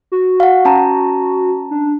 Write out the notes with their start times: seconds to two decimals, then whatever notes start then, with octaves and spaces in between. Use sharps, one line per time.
0.12 F#4
0.40 F5 F#5
0.65 C#4 A5 A#5
1.71 D4